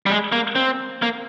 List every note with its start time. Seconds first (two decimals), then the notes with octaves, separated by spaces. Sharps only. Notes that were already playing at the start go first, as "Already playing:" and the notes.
0.06 G3
0.10 G#3
0.32 A#3
0.56 C4
1.02 A#3